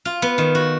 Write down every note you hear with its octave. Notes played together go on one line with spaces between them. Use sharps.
F4
B3
D#3
F#4